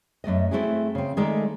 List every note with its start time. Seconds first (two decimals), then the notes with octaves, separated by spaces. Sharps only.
0.24 F#2 A3 D5 D#5
0.51 A3 C4 E4 F#4 G#4
0.95 C#3 C4
1.17 D#3 G#3 A3 D#4 A4 D5